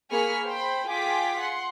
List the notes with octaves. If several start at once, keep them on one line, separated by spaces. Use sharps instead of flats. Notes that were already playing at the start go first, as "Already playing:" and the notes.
A#3 G#4 B5 C#6 F6 B6
C5 G5 B5
F4 G#4 G5 D6 B6
F#5 C6